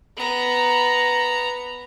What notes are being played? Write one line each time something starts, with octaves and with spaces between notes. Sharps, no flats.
B3 A#5